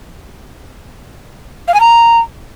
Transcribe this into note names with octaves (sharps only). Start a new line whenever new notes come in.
F5
G#5
A#5